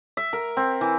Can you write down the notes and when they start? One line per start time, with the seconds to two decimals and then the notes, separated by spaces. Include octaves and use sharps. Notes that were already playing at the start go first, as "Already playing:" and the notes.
0.17 E5
0.33 A#4
0.57 C4
0.81 E3